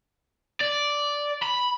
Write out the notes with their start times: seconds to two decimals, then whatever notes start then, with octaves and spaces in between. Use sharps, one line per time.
0.61 D5
1.42 B5